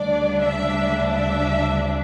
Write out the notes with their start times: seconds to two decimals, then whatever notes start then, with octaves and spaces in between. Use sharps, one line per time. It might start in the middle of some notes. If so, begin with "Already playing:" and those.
Already playing: D2 C#3 G3 D4 D5
0.41 E5
1.13 E5